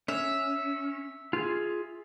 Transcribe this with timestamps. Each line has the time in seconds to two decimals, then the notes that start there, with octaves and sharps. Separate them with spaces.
0.08 C#4 E5
1.33 F4 G#4